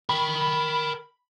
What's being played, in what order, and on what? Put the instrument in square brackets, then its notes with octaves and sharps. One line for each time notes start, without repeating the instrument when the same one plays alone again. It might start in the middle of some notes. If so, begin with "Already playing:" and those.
[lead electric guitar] A#4 G5 [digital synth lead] B5